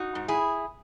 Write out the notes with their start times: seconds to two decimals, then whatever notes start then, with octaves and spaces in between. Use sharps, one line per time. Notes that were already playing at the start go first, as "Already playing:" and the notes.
Already playing: D#4 F#4
0.15 G#2
0.28 E4 G#4